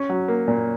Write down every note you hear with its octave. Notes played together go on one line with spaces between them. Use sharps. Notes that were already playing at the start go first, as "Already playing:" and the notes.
Already playing: C#4
F#3
A#3
A#2